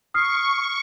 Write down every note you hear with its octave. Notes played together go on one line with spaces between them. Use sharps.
C#6 D#6 F6 C7